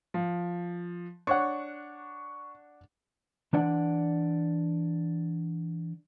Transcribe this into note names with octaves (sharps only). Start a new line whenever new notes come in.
F3
D4 C#5 F#5 C#6
E3 D4 D5 F#5